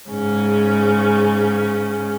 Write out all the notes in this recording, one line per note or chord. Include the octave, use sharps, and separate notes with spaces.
G#2 C#3 C#4